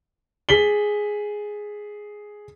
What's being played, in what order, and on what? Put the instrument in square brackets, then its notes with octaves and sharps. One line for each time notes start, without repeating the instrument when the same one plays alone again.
[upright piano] G#4 B6 F#7 G7